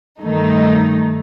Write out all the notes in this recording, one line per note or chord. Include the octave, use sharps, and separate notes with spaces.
G2 D#3 A3 D#4